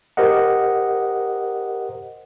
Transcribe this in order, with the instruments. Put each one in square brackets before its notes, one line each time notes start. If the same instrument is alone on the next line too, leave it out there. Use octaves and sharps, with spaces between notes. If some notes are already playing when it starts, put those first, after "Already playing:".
[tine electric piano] G4 A#4 C5 D#5 F#5